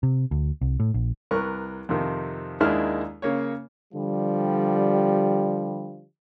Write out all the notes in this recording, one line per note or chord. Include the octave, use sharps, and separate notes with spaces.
C3
D2
C2
A2
A#1
C2 A#4 B4 C#6
F2 C3 D#3
D#2 D#3 G#3 D4 E4 F6
C#3 A#3 C#5
D3 F3 G3